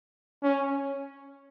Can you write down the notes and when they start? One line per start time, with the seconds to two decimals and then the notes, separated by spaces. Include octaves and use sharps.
0.43 C#4